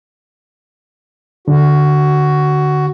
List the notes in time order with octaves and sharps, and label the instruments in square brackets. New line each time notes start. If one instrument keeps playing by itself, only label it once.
[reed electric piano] D3 [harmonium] F#4